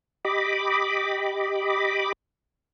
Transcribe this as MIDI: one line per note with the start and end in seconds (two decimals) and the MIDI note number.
0.25 2.13 67
0.25 2.13 75
0.25 2.13 83
0.25 2.13 86